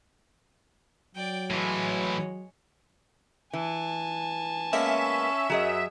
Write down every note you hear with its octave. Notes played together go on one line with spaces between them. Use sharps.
F#3 D5 G5
A2 E3 G#3 C#5
E3 G#5 A5
G#3 A#3 B3 C#4 E5
F#2 F#3 G#4 D#5